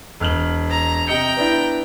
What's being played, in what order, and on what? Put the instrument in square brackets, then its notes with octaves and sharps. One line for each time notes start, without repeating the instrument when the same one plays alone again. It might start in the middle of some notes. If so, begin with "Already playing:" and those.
[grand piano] E1 F6 F#7
[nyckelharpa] A#5
[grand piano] C3 D#5 C#7 [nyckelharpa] G5 A#5
[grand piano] B3 D4 E4